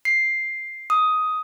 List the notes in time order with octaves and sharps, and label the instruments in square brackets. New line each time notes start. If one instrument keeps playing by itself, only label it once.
[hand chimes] C7
D#6